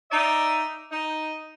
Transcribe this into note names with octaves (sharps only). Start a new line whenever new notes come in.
D#4 D5 E5
D#4